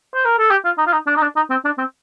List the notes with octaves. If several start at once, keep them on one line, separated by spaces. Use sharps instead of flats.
C5
A#4
A4
G4
F4
D#4
F4
D#4
D4
D#4
D4
D#4
C4
D4
C4